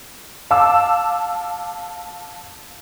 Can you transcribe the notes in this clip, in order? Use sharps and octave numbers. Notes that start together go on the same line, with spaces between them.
F5 A5 D6 E6